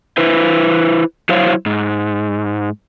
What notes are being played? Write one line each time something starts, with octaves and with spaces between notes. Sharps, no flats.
E4 B4 C5
F#3 E4 C5 C#5 F5
G#2